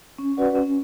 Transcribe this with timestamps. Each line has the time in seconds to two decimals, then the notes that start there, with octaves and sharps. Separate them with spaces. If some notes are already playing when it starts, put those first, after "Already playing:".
0.19 C#4
0.37 F#4 B4 D5 F#5
0.55 C#4